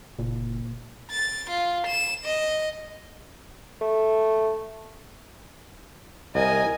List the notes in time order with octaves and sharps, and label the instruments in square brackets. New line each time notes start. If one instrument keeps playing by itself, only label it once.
[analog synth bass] F#1 [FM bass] A#2
[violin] A6
F4
E7
D#5
[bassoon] A3
[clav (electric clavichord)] C2 [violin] A#4 G#5 [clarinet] D#5